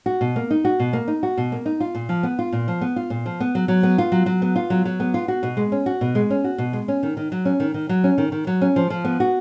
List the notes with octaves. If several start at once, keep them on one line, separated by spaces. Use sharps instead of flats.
F#4
B2
A#3
D#4
F#4
B2
A#3
D#4
F#4
B2
A#3
D#4
F4
A#2
F3
B3
F4
A#2
F3
B3
F4
A#2
F3
B3
F#3
F#3
B3
F4
F#3
F#3
B3
F4
F#3
F#3
B3
F4
F#4
B2
G#3
C#4
F#4
B2
G#3
C#4
F#4
B2
G#3
C#4
D#3
D#3
F#3
C#4
D#3
D#3
F#3
C#4
D#3
D#3
F#3
C#4
F3
F3
B3
F#4